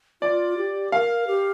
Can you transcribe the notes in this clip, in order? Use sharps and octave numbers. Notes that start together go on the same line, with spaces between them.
F4 D5
G4
A#4 F5
G4